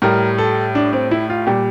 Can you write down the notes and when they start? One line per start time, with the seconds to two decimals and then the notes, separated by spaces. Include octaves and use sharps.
0.02 A2 G3 A#4
0.38 A4
0.75 D4
0.93 C4
1.11 E4
1.30 F4
1.47 A#2 G3 G4